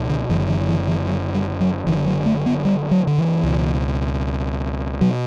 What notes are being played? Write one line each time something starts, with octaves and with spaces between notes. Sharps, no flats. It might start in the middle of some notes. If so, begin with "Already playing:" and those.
Already playing: C#2 B2
D3
F#1 F#2 D3 E3
E3
E3
E3
F#3
G3
F#3
F#1 F#2 D3 E3
F#3
A3
B3
G3
F#3
D3
E3
C#2 B2
B2 F#3